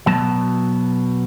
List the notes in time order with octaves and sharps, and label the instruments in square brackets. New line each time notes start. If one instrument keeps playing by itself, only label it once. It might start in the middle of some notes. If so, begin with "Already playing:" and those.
[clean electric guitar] B2 F#3 A5